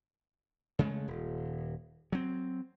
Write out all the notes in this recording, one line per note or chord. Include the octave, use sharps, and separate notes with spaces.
C#3 G#3 A3
D#1
F#3 C4